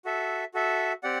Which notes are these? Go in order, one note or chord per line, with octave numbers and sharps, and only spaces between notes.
F#4 A4 E5
F#4 A4 E5
C4 G4 D5 F#5